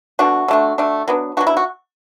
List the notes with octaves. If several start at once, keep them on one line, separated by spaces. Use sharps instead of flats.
B2 A3 D4 F#4
D3 A3 D4
D3 A3 D4
F#3 B3 D4
F#3 B3 D4 F#4
E4
F#4